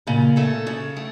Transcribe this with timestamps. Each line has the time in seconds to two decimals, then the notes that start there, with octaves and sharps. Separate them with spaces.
0.07 A#2 C#3
0.36 A3 C#4 A4
0.67 C#3
0.97 A3